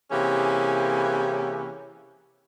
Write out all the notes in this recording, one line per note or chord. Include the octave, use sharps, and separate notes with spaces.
C3 E3 A#3 C#4 G4 G#4